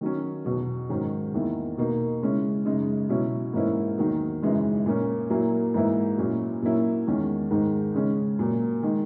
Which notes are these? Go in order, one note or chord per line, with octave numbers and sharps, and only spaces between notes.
D#3 F#3 C#4
E2 B2 F#3
G#2 D#3 F#3 C#4
E2 D#3 A#3 E4
B2 A#3 D#4
C#3 G#3 C#4 E4
F#2 C#3 G#3 D#4
B2 F#3 C#4 E4
G#2 E3 A#3 C#4 E4
E2 D#3 F#3 A#3 D#4
F#2 C#3 E3 G#3 D#4
A#2 A#3 C#4
A#2 F#3 A#3 E4
G#2 E3 A#3 E4
A#2 F#3 C#4 E4
A#2 F#3 A#3 C#4 E4
E2 D#3 G#3 C#4
G#2 D#3 G#3
C#3 G#3 C#4
A#2 F#3 A#3
D#3 G#3 D#4